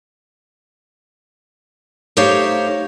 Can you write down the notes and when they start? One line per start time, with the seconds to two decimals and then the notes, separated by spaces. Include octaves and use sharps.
2.17 A3 D#4 G4 C5 C#5 F5